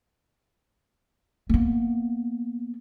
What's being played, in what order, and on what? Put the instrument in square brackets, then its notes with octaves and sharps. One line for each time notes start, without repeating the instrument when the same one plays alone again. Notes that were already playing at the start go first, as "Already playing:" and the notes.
[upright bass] A#3 B3